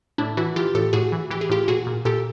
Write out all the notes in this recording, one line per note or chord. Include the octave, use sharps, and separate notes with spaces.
A2 D4 E4
E3 E4 F#4
E3 F4 G4
A2 G4 A4
A2 F#4 G#4
E3
E3 G4
G#4
A2 F4 G4
A#2 F#4 G#4
A#2
A#2 G4 A4